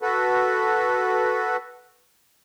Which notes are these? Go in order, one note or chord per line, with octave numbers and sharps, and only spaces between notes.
F#4 A4 B4